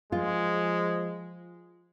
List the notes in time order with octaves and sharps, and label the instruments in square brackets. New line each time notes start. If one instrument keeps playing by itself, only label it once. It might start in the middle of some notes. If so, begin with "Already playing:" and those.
[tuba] F3 [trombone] G#3 [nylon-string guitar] F4